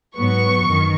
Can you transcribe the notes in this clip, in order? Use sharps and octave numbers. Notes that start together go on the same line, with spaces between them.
G#2 F#3 B3 C#6
F#2 D#3